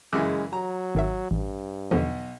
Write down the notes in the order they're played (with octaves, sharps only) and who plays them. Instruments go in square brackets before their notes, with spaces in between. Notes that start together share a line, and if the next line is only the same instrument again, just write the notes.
[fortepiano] F#2 C#3 E3 [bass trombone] G#3 [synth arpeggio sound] D6 E6 F#6
[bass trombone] F#3 [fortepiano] A#5
[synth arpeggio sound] G#1 D#3 E5
[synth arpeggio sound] A1 [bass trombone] G2
[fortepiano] B1 B2 [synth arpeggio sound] E2 D3 F3